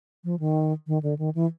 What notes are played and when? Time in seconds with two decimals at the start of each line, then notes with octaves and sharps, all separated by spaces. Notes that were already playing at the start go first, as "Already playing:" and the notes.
0.24 F3
0.40 D#3
0.87 D#3
1.03 D3
1.19 D#3
1.35 E3